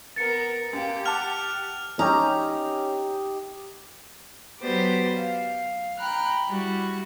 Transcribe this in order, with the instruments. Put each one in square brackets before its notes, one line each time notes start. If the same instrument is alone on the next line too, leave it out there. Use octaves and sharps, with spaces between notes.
[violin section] B3 A#4 [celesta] A6 C#7
[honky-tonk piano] F#2 A#3 [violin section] G4
[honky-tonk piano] F#5 A5 D6 [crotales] F6 F7
[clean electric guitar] C#4 [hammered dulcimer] D#4 G4 [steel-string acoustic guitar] A#5
[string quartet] F#3 B3 G4 B4 C5 D5
F5
G5 A#5 B5 F6 F#6
G3 E4 F#4